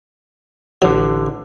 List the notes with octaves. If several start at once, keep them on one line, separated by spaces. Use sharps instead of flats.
A1 D3 F#3